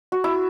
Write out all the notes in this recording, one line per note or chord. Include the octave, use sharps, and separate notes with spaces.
F#4
E4